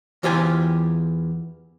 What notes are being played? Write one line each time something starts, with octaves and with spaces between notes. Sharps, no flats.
E2 E3 F4 G4 C5 G#5